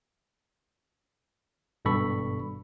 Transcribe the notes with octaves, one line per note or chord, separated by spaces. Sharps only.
G#1 G2 B2 A4 B5 C#6